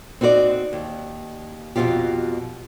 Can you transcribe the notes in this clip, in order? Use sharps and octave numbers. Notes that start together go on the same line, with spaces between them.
C4 D#4 F#4 C5 D5
D#2
F2 B2 D#3 C4 F4 G4